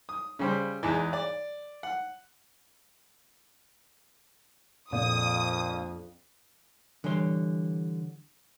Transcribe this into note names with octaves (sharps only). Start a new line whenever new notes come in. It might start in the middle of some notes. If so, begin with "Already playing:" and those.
D#6
C#3 G3 C5
E2 G#2 E3
D5
F#5
A#1 F2 D#6
D3 E3 G3 C#5 C6